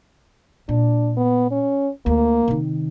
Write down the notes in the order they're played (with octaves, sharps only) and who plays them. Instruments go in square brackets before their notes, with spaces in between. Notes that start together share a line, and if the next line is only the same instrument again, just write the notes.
[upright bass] A#2 [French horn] D4
[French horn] B3
C#4
[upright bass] D2 [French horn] A#3
[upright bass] C3 D#3